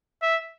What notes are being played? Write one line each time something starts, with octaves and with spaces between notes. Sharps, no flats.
E5